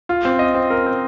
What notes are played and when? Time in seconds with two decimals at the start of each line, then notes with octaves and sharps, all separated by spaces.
0.09 F4
0.25 C4
0.39 D#5
0.55 C4
0.70 A#4
0.86 C4